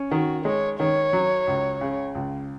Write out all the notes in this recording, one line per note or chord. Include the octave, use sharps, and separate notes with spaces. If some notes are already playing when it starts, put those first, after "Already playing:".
Already playing: C#4
D#3 F#4
G#3 C#5
D#3 C#5
F#3
C#2
C#3
C#2